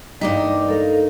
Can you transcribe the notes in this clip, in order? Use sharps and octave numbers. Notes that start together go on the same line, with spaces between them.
G2 E3 G3 G#3 A#3 D#4 D5 D6
A4 A#4 F5